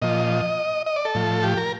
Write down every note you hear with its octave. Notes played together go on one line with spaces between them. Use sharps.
A#2 F3 D#5
D#5
D5
A4
A2 F3
G4
A#4